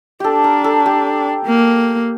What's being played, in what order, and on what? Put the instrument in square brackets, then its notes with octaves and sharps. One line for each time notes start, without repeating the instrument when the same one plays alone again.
[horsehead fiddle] D4 [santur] G4 A4
[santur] A#4
A4
G4
[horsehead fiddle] A#3